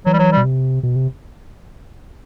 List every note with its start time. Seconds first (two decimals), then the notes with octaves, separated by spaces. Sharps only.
0.06 E3 F#3
0.13 G3
0.19 F#3
0.32 G3
0.37 B2
0.44 C3
0.83 B2
0.96 C3